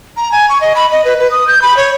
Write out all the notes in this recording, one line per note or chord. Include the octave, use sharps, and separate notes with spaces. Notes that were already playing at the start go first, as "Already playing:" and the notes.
A#5
G#5
C#6
D#5
B5
D#5
B4
B4
D#6
G6
B5
C#5